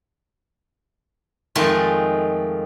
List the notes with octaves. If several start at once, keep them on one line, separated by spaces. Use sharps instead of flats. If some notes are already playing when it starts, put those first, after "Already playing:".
F2 D#3 G#3 A3 F4 A5